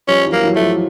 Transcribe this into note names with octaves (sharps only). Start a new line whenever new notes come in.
F3 G3 C#4
E3 F#3
A#3
E3 F#3
A3
F3